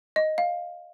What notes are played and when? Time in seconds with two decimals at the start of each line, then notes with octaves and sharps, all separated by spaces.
0.16 D#5
0.38 F5